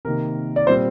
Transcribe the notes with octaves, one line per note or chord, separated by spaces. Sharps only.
C3 D#3 A#3 A#4
D5
A#2 G3 C4 C5